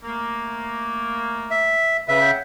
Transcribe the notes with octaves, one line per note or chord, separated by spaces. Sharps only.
A3 A#3
E5
C#3 B4 E5
C#5 F#5 G5